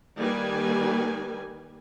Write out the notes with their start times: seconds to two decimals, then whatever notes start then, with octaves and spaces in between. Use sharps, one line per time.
0.17 D#3 G3 A#3 G4 B4 G#5